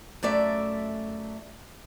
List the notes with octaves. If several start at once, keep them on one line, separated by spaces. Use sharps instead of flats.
F#2 A3 D5 E5